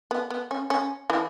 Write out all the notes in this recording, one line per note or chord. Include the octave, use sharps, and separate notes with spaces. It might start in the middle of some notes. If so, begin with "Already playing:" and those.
B3
B3
C#4
C#4
E3